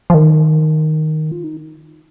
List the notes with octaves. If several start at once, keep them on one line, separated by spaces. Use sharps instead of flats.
F3
D#3
F4
D#4